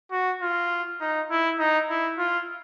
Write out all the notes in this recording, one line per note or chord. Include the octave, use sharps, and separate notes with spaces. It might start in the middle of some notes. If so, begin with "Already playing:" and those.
F#4
F4
D#4
E4
D#4
E4
F4